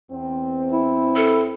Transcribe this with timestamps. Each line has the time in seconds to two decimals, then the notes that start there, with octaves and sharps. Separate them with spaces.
0.11 E2 C4
0.72 E4
1.16 A4